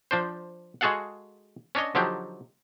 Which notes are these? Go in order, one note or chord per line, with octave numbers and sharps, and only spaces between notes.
F3 D4 C5
G#3 F#4 G#4 A4 F5 F#5
C#4 D4 C#5 D#5
D3 F3 F#3 D4 D#4 G4